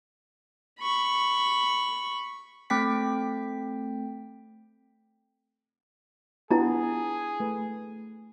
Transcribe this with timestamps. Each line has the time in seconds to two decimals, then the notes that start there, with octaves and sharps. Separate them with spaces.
0.80 B5 C#6
2.70 A3 C4 G5 B6
6.51 B3 D4 E4 F4 G#4 A5 A#5
7.40 A3 B4